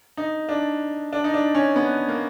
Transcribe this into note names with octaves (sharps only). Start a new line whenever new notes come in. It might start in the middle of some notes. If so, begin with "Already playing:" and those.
D#4
D4
D4
D#4
D4
C#4
B3
A#3